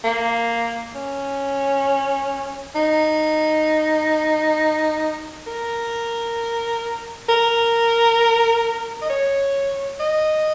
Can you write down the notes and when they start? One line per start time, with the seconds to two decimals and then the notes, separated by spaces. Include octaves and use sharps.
0.04 A#3
0.95 C#4
2.75 D#4
5.47 A#4
7.29 A#4
9.02 D#5
9.09 C#5
10.00 D#5